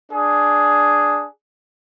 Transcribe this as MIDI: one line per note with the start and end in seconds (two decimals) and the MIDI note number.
0.12 1.25 62
0.12 1.25 68